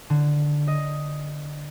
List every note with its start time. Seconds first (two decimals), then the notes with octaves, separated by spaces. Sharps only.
0.10 D3
0.67 D#5